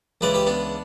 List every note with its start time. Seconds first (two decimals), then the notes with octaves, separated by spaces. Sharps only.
0.21 C#2 C#3 E3 B4 D5
0.34 G4 B4
0.46 B3 D4